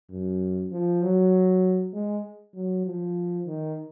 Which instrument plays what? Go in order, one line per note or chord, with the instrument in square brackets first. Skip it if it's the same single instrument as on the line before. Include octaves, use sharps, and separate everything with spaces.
[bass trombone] F#2
F3
F#3
G#3
F#3
F3
D#3